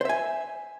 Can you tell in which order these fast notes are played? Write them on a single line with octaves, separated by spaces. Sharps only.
C5 E5 G#5